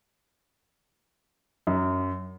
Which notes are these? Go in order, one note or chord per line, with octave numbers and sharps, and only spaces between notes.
F#2